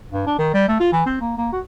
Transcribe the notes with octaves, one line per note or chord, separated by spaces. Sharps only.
G2
D4
D#3
G3
A3
F4
E3
C4
A#3
A#3
F#4